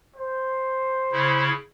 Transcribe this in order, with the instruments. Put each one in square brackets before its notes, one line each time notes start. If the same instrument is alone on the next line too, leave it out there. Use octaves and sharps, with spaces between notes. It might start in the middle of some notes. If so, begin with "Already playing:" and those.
[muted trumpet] C5
[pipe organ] C#3 E4